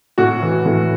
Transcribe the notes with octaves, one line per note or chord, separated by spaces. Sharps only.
A2 F#4
E3
A2